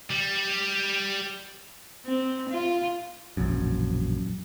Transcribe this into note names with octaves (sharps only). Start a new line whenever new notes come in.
G3
C4
F4
E1 A#1 F#2